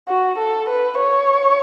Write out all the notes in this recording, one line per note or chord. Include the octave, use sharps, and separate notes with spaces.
F#4
A4
B4
C#5